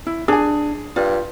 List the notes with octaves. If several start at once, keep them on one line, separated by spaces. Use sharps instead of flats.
E4
D4 G#4 G#5
G2 F4